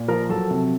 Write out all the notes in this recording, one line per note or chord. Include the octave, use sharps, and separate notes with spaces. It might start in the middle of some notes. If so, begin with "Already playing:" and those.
Already playing: A#2
F3 A#4 A#5
F#3 A4 A5
C3